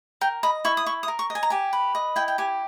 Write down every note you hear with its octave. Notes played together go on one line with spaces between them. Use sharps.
A#4 G5
D#5 B5
E4 C#6
D#6
E4 C#6
D#6
A#4
C#6
D#5
G#5
A#5
G4 G#5
B4
D#5
E4 G5
G5
G4 G#5